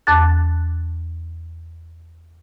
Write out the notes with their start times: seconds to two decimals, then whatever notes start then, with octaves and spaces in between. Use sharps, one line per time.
0.07 E2 A5 D6 F#6 A6